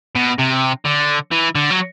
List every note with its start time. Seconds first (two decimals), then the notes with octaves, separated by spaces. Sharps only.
0.15 B2
0.38 C3
0.85 D3
1.32 E3
1.55 D3
1.71 F#3